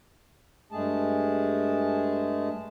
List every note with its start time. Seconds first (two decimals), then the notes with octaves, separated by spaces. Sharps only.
0.72 G2 G#3 A3 G#4 A5